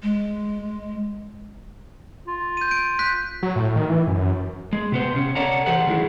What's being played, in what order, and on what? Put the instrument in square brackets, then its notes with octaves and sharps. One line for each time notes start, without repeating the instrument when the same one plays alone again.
[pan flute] G#3
[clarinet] F4
[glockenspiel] G6 D#7
G6 D7
F#6 G6 B6
[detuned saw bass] F#3
A2
D#3
E3
F#2
F#2
[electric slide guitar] G#3
C3 B3 C5
C3 C#4
A4 C#5 D5 F#5 A5 A#5
E3 G4 A4 C5 F#5
D#3 E3 F#3 G#3 E4